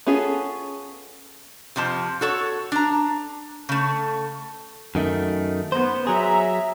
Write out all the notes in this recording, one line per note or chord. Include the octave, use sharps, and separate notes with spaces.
B3 C#4 F4 G#4 A4
F2 C3 F3 A5
F#4 A4 C#5
D4 A#5
C#3 A3
F#2 D#3 A3
B3 C5
F#3 G#4 E5 A#5